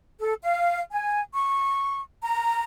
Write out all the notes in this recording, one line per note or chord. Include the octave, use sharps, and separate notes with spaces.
A4
F5
G#5
C#6
A#5